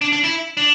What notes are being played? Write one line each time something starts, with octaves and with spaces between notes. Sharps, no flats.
D4
D4
E4
D4